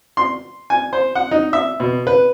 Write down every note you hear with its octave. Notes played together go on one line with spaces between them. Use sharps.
C6
G#5
C5
F#5
D#4
E5
B2
B4